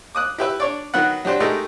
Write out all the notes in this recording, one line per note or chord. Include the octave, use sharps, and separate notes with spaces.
D6 D#6 F#6
E4 G4 B4 E5
D4 C#5 D5
D#3 F#3 B3 F#5
F#3 D4 G4 C5
G#3 A3 D#4 G4 A#4